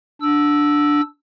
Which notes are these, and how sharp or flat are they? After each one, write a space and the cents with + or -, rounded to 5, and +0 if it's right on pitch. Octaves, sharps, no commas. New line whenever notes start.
D4 +0 E6 +0